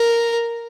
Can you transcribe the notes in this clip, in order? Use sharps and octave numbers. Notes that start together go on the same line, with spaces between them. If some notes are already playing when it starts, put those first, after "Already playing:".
Already playing: A#4